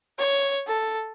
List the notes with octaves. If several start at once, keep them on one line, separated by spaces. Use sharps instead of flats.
C#5
A4